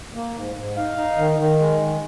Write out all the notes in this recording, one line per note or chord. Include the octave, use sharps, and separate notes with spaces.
A#3
G#2
G#2
D#4 F5
D#4
D#3
D#3
G#3
D#3